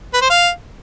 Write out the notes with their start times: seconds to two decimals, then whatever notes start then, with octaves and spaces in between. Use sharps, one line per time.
0.14 B4
0.22 C5
0.30 F5